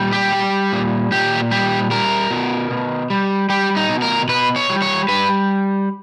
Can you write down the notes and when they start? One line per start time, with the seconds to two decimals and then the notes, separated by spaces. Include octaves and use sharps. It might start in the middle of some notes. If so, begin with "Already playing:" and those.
Already playing: A#2 G3
0.13 G4
0.32 G3
0.72 A#2
1.11 A#2 G4
1.51 G3 G4
1.91 G3 A#4
2.31 B2
2.70 B2
3.10 G3
3.49 G3 G4
3.77 D#4
3.89 B2
4.02 A#4
4.29 B2 B4
4.56 C#5
4.69 G3
4.82 C#5
5.08 G3 B4